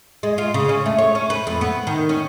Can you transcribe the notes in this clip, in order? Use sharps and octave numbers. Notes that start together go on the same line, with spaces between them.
G#3
F4
C#3
C#4
A3
C#5
C#4
B4
F2
B3
D#3
C#4